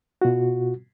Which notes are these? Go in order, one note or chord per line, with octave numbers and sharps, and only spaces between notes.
B2 F4 F#4